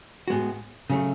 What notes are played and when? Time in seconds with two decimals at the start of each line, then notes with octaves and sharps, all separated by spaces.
0.28 A2 G#3 B3 F#4
0.90 C#3 F#3 A3